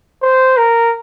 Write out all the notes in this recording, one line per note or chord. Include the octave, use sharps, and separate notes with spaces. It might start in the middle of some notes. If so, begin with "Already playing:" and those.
C5
A#4